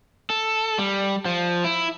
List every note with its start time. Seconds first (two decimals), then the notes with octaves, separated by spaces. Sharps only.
0.30 A4
0.78 G3
1.25 F3
1.64 E4